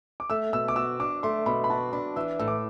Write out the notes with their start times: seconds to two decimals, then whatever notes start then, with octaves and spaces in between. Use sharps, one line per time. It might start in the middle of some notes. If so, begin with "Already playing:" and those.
0.20 D6
0.30 A3 E6
0.53 B2 E6
0.68 D6
0.76 F#4 E6
1.00 D4 D6
1.23 A3 C6
1.46 B2 B5
1.64 B5
1.70 F#4 A5
1.93 D4 B5
2.16 E3 E6
2.39 A2 E6
2.48 D6